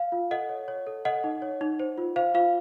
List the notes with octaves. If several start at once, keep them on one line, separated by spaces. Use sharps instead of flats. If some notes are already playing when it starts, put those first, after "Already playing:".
Already playing: F5
F4
A4 D#5 F#5
C#5
C#5
A4
A4 D#5 F#5
D#4
C#5
D#4
C5
F4
C5 F5
F4 F5